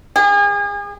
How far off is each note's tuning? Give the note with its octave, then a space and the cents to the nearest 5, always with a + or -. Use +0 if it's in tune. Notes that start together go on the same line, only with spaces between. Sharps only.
G#4 -40